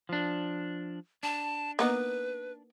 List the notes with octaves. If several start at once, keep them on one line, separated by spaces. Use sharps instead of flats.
F3 D4
D4 A5
A#3 B3 D#4 B4